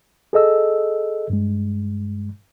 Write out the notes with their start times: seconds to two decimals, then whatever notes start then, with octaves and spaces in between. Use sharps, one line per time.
0.33 G#4 A4 D#5 E6
1.30 G2 G#3